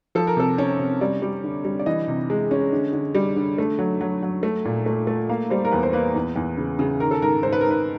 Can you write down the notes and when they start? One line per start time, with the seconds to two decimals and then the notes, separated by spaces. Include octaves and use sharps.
0.15 F3 A4
0.27 A#4
0.37 C3 A4
0.58 C#4
0.79 C3
1.01 G3 D5
1.22 G3
1.44 D3
1.65 G3
1.79 D5
1.86 E3 D#5
2.08 C3
2.30 G#3
2.51 C#4
2.72 D3
2.93 D3
3.15 G3
3.36 D3
3.58 A3
3.79 F#3
4.01 F#3
4.22 F#3
4.43 A3
4.65 A#2
4.86 A3
5.07 A3
5.29 A#3 F5
5.50 G3 C5
5.65 A#4
5.71 E2 B4
5.83 C5
5.93 A#3 B4
6.14 E2
6.36 E2
6.57 C#3
6.79 C#3
7.00 D#3 A#4
7.11 A4
7.21 G#2 A#4
7.43 G#2 C5
7.53 B4
7.61 G#2 A#4
7.71 B4